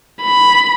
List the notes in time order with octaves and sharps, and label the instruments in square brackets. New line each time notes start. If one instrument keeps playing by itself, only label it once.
[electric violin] B5